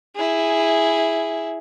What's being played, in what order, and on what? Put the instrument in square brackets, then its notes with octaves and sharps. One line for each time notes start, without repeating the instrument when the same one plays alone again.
[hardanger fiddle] E4 G#4